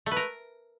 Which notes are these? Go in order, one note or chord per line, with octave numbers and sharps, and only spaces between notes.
A3
B4
A#4